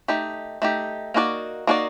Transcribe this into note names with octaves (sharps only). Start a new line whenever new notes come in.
A3 D#4 G4
A3 D#4 G4
A#3 D#4 F#4 A#4 D5
A#3 D#4 F#4 A#4 D5